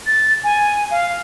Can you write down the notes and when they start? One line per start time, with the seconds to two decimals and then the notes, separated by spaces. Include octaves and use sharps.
0.07 A6
0.44 G#5
0.91 F5